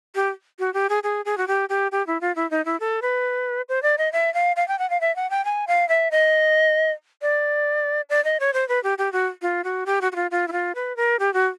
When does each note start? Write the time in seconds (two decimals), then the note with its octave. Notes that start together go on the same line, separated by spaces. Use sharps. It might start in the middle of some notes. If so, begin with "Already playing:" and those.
0.15 G4
0.59 F#4
0.74 G4
0.89 G#4
1.03 G#4
1.25 G#4
1.38 F#4
1.48 G4
1.69 G4
1.92 G4
2.07 E4
2.21 F4
2.36 E4
2.51 D#4
2.65 E4
2.80 A4
3.02 B4
3.69 C5
3.83 D5
3.98 D#5
4.13 E5
4.34 F5
4.56 F5
4.68 G5
4.79 F#5
4.90 F5
5.01 E5
5.16 F#5
5.30 G5
5.45 G#5
5.68 F5
5.89 E5
6.11 D#5
7.22 D5
8.10 D5
8.24 D#5
8.40 C#5
8.54 C5
8.69 B4
8.84 G4
8.98 G4
9.13 F#4
9.42 F4
9.64 F#4
9.86 G4
10.01 F#4
10.12 F#4
10.16 F4
10.31 F4
10.48 E4
10.52 F4
10.75 B4
10.97 A#4
11.19 G4
11.34 F#4